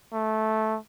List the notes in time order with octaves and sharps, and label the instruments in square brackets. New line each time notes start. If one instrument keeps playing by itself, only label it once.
[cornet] A3